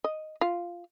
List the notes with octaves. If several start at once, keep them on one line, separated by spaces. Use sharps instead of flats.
D#5
F4